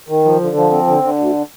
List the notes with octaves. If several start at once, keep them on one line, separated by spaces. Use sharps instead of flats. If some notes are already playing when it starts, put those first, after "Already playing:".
D#3
F3
D3
F3
C4
D3
D3
D2